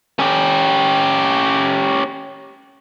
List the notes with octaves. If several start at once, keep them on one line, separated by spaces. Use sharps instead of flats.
C#4 G4